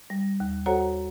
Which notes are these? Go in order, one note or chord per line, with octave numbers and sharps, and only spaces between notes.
G3
D#2
F#4 A4 C5 C#5 F#5 A#5